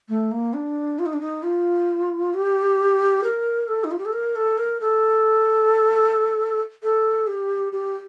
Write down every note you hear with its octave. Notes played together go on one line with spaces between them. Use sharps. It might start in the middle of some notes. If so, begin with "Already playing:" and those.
A3
A#3
D4
F4
D#4
D4
D#4
F4
G4
A#4
A4
D#4
F4
G4
A4
A#4
A4
A#4
A4
A4
G4
G4